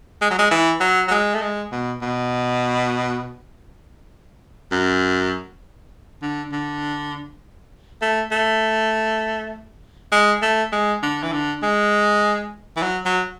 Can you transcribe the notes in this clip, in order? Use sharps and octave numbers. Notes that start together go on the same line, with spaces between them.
G#3
F#3
G#3
E3
F#3
F#3
G#3
A3
G#3
B2
B2
F#2
D3
D3
A3
A3
G#3
A3
G#3
D3
E3
D3
G#3
E3
F#3
F#3